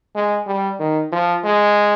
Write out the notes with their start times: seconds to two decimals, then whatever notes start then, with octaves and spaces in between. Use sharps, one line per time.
0.15 G#3
0.46 G3
0.79 D#3
1.12 F3
1.44 G#3